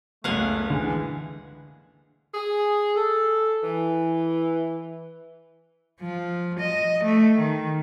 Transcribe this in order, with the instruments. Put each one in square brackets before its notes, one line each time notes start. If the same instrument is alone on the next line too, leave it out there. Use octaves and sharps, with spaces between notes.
[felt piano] F#1 C#2 [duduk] A3 [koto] F5 F#5 G#5
[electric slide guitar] D3 G#4 [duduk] E3
[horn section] G#4
A4
E3
[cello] F3
D#5
A3
D#3